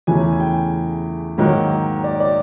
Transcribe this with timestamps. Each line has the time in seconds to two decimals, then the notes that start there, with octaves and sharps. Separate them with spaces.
0.07 E2 C#3 E3 A3 G#5
0.33 G#5
0.40 G5
1.38 G#2 D#3 F#3 A#3
2.04 D5
2.20 D5